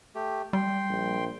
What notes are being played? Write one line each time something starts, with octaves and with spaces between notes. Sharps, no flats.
A3 G4
G3 G5 C6
A#1